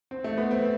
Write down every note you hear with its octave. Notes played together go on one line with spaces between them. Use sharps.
C4
A3
B3
C4